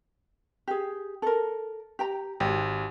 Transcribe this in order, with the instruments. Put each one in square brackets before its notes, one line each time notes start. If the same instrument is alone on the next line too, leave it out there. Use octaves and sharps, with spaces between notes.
[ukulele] G4 G#4
A4 A#4
G4 G5 A#5
[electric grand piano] G#1 [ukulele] G4